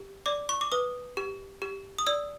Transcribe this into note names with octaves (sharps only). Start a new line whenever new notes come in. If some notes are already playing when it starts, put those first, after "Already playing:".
Already playing: G4
D5 D6
C#6
D6
B4 D#6
G4
G4
D#6
D5 E6